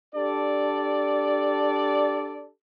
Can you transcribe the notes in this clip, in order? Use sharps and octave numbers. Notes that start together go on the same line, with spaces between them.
D4 G4 A4 D5